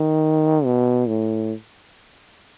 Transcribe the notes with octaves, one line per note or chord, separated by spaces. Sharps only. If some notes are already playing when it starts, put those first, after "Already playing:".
Already playing: D#3
B2
A2